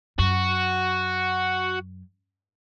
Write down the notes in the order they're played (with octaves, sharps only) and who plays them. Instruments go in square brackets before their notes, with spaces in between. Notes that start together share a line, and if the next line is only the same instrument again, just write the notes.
[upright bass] F#2 [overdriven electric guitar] F#4